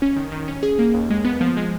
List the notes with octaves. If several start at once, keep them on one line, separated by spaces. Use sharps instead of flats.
C#4
D#3
D#3
C#4
G#4
A#3
D#2
G#3
B3
F3
G#3